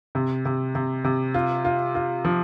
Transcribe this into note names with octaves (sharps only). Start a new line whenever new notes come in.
C3
C3
C3
C3
F4
F4
F4
F3